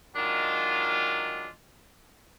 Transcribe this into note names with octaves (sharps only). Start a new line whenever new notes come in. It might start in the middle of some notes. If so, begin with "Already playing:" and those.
D#3 F#3 G#3 D4 F4